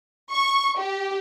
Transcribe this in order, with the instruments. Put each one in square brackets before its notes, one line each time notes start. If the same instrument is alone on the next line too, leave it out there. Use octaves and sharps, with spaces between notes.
[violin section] C#6
G4